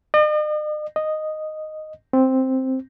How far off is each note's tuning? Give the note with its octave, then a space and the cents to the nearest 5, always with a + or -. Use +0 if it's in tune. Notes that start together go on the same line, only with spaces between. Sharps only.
D#5 -45
D#5 -5
C4 +0